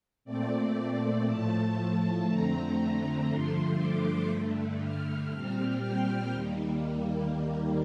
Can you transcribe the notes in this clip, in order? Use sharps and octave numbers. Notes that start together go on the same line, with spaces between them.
A#2 A3 C4 D5
A2 F3 A3 A5
F2 D3 A3 C4 A#5
G2 D3 F3 A3 C6
D6
G2 D3 A3
F6
A#2 G3 C4 F6
G5
D#2 D#3 G3 A#3